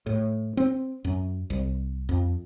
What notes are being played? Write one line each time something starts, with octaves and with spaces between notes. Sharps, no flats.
A2
C4
F#2
C2
F2